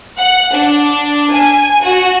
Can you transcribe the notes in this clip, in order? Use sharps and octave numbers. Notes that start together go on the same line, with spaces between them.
F#5
D4
G#5
F#4